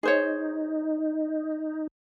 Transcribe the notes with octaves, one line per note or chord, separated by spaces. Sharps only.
D#4 G#4 C5 C#5